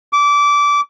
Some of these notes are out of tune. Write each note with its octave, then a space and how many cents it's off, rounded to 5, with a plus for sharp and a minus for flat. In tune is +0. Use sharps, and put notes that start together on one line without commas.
D6 -20